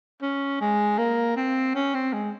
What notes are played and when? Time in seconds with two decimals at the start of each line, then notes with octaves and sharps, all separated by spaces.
0.22 C#4
0.61 G#3
0.98 A#3
1.36 C4
1.75 C#4
1.94 C4
2.13 G#3